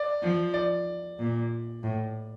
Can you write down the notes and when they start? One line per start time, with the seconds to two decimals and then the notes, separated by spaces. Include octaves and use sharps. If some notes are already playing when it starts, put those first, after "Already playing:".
Already playing: D5
0.22 F3
0.54 D5
1.19 A#2
1.83 A2